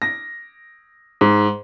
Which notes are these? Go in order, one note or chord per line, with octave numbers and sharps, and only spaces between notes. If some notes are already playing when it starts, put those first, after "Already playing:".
A#6
G#2